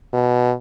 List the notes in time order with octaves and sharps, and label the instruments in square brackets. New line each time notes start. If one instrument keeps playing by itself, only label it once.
[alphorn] B2